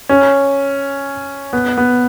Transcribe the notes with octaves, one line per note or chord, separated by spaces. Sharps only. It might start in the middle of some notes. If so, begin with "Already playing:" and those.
C#4
B3
B3